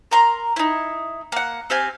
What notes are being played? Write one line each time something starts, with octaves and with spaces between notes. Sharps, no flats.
A#4 A#5 C6
D#4 E4
A#3 F#5
C4 G4 F5 G#5